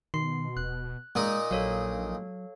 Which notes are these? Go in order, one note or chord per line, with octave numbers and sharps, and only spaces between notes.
B2 D#3 C6 C7
D#1 F#6
A#2 G#3 D#4
A#1 F#3 A4 C#5 F5